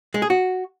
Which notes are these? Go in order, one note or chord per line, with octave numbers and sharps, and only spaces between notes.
G#3
G#4
F#4